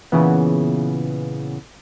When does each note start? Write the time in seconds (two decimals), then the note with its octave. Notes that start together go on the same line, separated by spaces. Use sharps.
0.12 A#2 C#3 E3 B3